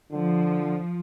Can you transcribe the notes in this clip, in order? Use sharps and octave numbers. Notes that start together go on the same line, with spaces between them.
D3 F3